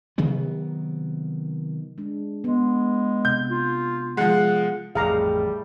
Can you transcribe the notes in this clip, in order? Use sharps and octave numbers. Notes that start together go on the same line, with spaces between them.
C3 D#3 F#3 B3
G#3 D4
G#3 B3
C3 G6
F4
F3 G#3 F#5
A1 F2 A2 G3 G#4 F5 A#5 D6